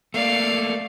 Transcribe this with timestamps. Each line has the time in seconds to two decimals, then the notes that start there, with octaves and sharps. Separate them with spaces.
0.14 A3 A#3 D5 F5